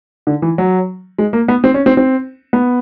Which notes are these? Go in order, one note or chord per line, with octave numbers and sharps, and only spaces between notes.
D3
E3
F#3
G#3
A#3
B3
C4
C#4
C4
C4
B3